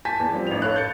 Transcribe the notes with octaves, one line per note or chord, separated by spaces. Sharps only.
G#5 A5 G6 B6
E2
F3 G3 C4
A1 D#4 F7
A4 C#5 F5 B5 F#6
G6 A6 C#7